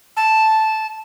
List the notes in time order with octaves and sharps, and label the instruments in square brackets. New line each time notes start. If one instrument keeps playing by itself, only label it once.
[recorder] A5